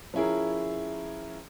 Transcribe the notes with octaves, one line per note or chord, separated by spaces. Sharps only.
F3 C#4 E4 G#4 A#4